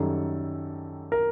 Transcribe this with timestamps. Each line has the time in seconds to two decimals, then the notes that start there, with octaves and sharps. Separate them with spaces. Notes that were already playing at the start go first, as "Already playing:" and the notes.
Already playing: F#2 D#3 G3 A4
1.12 A#4